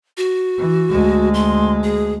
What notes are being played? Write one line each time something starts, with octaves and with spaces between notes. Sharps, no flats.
F#4
E3
D2 G#3
C6
G#4